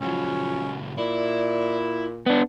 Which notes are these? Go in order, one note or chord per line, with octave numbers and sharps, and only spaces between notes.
C#2 F3 F#3 C#4
A#2 E4 D5
B3 D4 D5